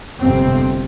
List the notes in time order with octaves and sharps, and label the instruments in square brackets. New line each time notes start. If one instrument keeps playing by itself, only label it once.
[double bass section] G1 F2 C3 C4